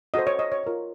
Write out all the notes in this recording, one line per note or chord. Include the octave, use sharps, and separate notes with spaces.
F#4 A4 C5 D#5
C#5
D#5
C#5
F4 A#4 C#5